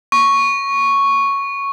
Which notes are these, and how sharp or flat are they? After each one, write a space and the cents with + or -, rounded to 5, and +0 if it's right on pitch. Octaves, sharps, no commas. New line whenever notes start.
C#6 +0